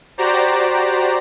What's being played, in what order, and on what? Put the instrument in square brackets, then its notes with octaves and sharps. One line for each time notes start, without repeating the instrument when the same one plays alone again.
[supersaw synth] F#4 G4 C5 D5 A#5